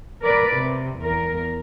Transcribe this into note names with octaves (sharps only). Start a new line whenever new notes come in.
A#4 B4 D5
C3
E2 A#4